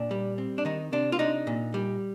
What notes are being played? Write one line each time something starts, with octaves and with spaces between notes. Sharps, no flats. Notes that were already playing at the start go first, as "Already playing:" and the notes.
Already playing: A#2 D4
G3
C4
D4
D#3 D#4
C3 D4
F4
D4 D#4
A#2
G3